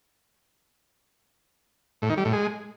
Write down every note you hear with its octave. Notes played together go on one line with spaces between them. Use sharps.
A2
D#3
G3
A2
G#3